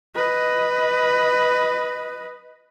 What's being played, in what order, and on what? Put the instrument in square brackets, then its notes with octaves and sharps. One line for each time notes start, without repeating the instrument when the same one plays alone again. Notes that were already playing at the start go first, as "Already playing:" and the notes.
[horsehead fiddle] B4 D#5